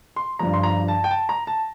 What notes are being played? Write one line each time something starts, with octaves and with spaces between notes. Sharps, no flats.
C6
G1 G2 F3 A#5
C6
A#5
A5
G5
A5
A#5
A5